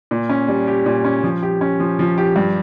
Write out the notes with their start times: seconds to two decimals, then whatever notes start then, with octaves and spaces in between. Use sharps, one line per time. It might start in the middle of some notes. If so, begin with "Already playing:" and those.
0.11 A#2
0.29 C#4
0.48 G3
0.67 G4
0.86 A#2
1.04 C#4
1.23 F3
1.42 G4
1.61 C#4
1.80 F3
1.99 F3
2.18 G4
2.36 G2